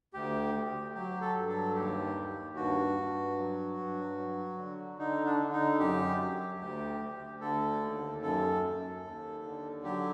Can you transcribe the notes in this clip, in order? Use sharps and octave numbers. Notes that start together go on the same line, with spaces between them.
D2 G4
D2
F#3 G4
A4
G2
A4
D#2 G4
D#2
G2 F#4
G2
F#3
G2
F#3
D3
D3 D#4
D4
D3
D#4
F#2 G4
F#3
D2 G4
D2
D3 A4
D#2
F#2 A4
F#2
D#2
D3
F#3 G4